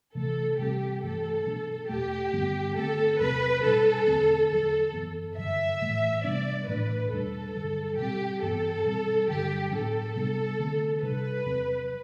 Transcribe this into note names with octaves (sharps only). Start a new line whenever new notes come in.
C3 E3 A3 A4
C3 G3 C4 G4
G2 E3 A3 A4
B2 F#3 B3 D4
E2 B2 A3 G4
G2 D3 G3 B3
D3 A3 C4 A4
E2 C3 F#3 C4 B4
B2 G3 B3 D4 A4
E2 D3 A3 C4
E2 D3 F#3 A4
F#2 E3 B3
G2 D3 F#3 E5
A2 E3 A3
C3 G3 B3 D4 D5
A2 E3 A3 D4 B4
E2 B2 G3 D4 A4
G2 D3 F#3
B2 G3 C4 G4
G2 E3 B3 A4
B2 G3 C4
G2 D3 F#3 G4
A2 F#3 B3 D4 A4
C3 G3 B3 D4
D3 A3 C4
C3 G3 D4 B4
E2 C3 F#3 C4